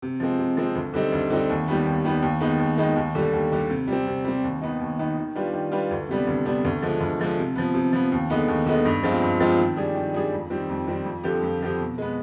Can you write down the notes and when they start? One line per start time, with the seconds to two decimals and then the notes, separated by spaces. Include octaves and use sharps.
0.02 C3
0.20 F3 G#3 C4
0.39 C3
0.57 F3 G#3 C4
0.75 D2
0.94 D3 G3 C4 D#4
1.12 D2
1.30 D3 G3 C4 D#4
1.50 D#2
1.68 D#3 G3 B3
1.85 D#2
2.05 D#3 G3 B3
2.22 D#2
2.41 D#3 G#3 B3 D#4
2.59 D#2
2.78 D#3 G#3 B3 D#4
2.96 D#2
3.15 D3 G3
3.33 D#2
3.52 D3 G3
3.70 C3
3.88 G3 C4
4.07 C3
4.25 G3 C4
4.44 D#2
4.61 D#3 B3 D#4
4.80 D#2
4.99 D#3 B3 D#4
5.17 D#3
5.36 G3 D4 F4 B4
5.53 D#3
5.72 G3 D4 F4 B4
5.91 D2
6.09 C3 G3 B3 D4
6.27 D2
6.45 C3 G3 B3 D4
6.65 D2
6.82 D3 F3 G#3
7.01 D2
7.19 D3 F3 G#3
7.38 C3
7.55 F3 B3
7.74 C3
7.93 F3 B3
8.12 D#2
8.30 D3 G#3 B3 D#4
8.48 D#2
8.66 D3 G#3 B3 D#4
8.85 G2
9.03 F3 G#3 C4 F4
9.22 G2
9.40 F3 G#3 C4 F4
9.59 D#3
9.76 G3 D4 G#4
9.95 D#3
10.14 G3 D4 G#4
10.33 F2
10.50 D#3 G3 C4
10.69 F2
10.87 D#3 G3 C4
11.05 F2
11.24 D3 F3 C4 G4
11.42 F2
11.61 D3 F3 C4 G4
11.79 B2
11.98 G#3 B3